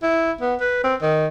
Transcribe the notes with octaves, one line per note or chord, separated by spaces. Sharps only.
E4
B3
B4
C4
D#3